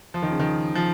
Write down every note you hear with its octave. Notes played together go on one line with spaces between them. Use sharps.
F3
D#3
C#3
D#3
F3